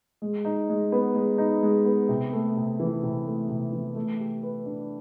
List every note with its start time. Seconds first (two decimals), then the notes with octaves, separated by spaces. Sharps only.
0.22 G#3
0.45 D#4
0.69 G#3
0.92 B3
1.15 G#3
1.38 D#4
1.63 G#3
1.85 B3
2.09 C3
2.33 A3
2.56 C3
2.80 E3
3.03 C3
3.26 A3
3.49 C3
3.73 E3
3.95 A3
4.20 G4
4.43 B4
4.66 D4